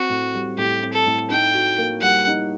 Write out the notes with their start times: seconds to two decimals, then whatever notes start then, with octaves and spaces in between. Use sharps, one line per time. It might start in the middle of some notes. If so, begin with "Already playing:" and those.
Already playing: C4 F#4
0.10 A2
0.34 G3
0.58 A2 G4
0.81 C4
0.93 A4
1.06 A2
1.30 D#4 G5
1.54 F#4
1.78 A#3
2.02 G3 F#5
2.27 D#4